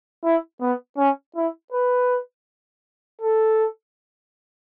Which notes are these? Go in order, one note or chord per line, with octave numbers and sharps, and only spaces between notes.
E4
B3
C#4
E4
B4
A4